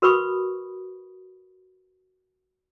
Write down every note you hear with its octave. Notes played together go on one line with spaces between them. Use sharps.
F#4 A#4 B4 B5 C#6 D#6